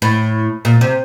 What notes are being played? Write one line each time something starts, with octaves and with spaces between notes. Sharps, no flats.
A2
A#2
C3